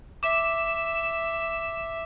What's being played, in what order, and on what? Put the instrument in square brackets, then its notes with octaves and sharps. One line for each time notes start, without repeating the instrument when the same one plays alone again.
[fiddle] E5 [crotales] D6 E7